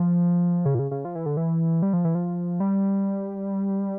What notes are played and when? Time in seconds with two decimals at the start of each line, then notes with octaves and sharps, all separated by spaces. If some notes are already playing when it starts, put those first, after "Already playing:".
Already playing: F3
0.65 C#3
0.75 A#2
0.79 C#3
0.91 C#3
1.05 F3
1.15 E3
1.26 D3
1.37 E3
1.82 G3
1.93 F3
2.05 E3
2.15 F3
2.60 G3